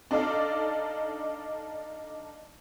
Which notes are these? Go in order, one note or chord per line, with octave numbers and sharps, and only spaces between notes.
D4 D#4 A4 D5 F5